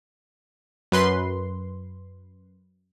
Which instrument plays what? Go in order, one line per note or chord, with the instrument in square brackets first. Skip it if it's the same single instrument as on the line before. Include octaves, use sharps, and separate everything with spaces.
[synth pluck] F#2 B4 C6